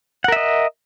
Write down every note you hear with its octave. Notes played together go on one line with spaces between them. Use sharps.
A#4 D#5 E5 F#5